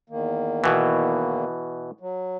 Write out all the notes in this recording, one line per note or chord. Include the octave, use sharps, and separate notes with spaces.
E2 D#3 A#3
B2 E3
F#3